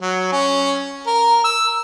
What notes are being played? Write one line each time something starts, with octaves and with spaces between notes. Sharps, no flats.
F#3
C#4
A#4
E6